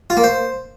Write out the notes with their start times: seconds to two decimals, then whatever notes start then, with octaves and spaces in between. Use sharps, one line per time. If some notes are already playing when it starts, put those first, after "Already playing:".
0.10 F4
0.17 A#3
0.24 C5